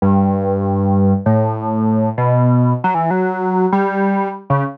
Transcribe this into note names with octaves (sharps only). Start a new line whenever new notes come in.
G2
A2
B2
F#3
E3
F#3
G3
C#3